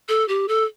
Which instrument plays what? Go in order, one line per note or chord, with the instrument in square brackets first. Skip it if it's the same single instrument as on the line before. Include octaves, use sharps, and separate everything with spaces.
[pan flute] A4
G4
A4